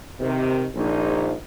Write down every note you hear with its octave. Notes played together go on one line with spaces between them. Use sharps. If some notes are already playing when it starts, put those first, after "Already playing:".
C3 D#3
A#1 D#4